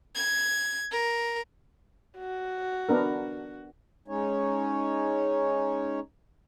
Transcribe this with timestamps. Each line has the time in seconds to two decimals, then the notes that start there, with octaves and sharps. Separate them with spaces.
0.15 G#6
0.91 A#4
2.18 F#4
2.89 B3 D4 A#4
4.08 G#3 C#4 D#4 C#5